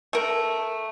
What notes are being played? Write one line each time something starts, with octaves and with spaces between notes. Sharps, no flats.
A3 A#4